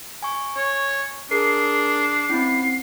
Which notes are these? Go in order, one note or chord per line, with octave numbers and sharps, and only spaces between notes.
G#5 C#6
C#5
D4 G#4 A#4 C7
C4 C#4 E4